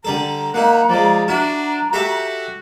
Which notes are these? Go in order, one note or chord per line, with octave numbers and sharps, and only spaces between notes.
D3 G3 A4 A#5
A#3 D#4 E4 F#5
F3 G#3 D5
D4 E4 F#4 A#5
F#4 G4 A4 E5